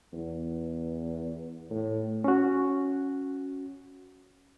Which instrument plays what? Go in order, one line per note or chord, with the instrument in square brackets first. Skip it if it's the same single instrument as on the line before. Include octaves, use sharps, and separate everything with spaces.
[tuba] E2
A2
[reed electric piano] C#4 F#4